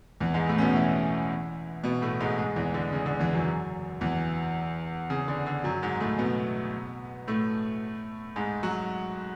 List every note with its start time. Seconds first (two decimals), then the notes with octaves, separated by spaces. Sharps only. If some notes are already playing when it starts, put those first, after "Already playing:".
0.20 E2 E3
0.34 G#2 G#3
0.49 A2 A3
0.58 C#4
0.61 B2 B3
0.75 E3 E4
1.84 B2 B3
2.02 A2 A3
2.20 G#2 G#3
2.38 G#2 G#3
2.56 E2 E3
2.74 D3
2.93 C#3
3.06 D3
3.19 E2 E3
3.33 F#2 F#3
4.01 E2 E3
5.10 C#3
5.28 D3
5.46 D3
5.64 F#2 F#3
5.83 G#2 G#3
6.00 A2 A3
6.18 B2 B3
7.27 A2 A3
8.36 G#2 G#3
8.63 F#3 F#4